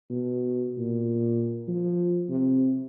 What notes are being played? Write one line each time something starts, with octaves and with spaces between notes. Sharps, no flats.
B2
A#2
F3
C3